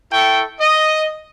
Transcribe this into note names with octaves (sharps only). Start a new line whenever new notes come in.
E4 A4 G5 C#6
D#5